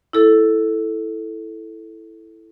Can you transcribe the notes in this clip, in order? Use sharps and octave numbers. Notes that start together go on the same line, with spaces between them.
E4 A4